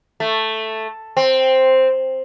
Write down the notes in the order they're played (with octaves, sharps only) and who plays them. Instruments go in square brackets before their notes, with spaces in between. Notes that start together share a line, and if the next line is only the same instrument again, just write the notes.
[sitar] A3
C4